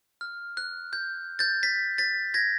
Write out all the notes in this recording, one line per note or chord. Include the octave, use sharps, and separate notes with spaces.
F6
F#6
G6
G6 A6
A6 B6
A6 B6
G#6 A#6